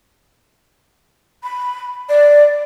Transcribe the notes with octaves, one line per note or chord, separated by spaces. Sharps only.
B5
D5